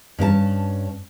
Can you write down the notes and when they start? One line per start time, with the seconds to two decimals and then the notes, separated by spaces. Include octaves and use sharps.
0.19 G2 C#4 A#4 A5